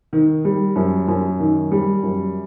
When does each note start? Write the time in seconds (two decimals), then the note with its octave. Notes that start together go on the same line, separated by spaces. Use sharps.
0.13 D#3
0.45 G3
0.76 F#2
1.08 F#2
1.40 D#3
1.72 G3
2.03 F#2